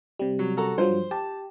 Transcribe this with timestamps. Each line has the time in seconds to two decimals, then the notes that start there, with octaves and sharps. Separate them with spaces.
0.19 C3 G3
0.39 F#3
0.57 F#4 A4 A#5
0.78 G2 F3 F#3 C5
1.11 G4 A5